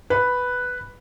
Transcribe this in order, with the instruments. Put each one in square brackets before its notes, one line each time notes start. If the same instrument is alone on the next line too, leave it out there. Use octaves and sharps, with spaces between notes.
[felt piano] B4